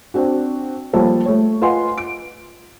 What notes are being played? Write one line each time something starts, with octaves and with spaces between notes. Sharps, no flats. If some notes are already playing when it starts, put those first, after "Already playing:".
C4 D4 F#4
F3 G3 A#3 A4 C5 C#5
A3 C#5
F4 B4 D#5 F#5 G#5 C6
D7